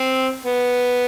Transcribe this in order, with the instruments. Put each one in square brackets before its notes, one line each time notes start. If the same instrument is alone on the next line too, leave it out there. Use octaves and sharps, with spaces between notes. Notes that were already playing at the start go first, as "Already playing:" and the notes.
Already playing: [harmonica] C4
B3